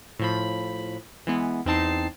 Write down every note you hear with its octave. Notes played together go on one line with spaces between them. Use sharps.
A2 F3 B5
E3 G#3 B3
E2 C4 D#4 A5 C7